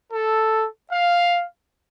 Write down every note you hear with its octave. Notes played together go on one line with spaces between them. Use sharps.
A4
F5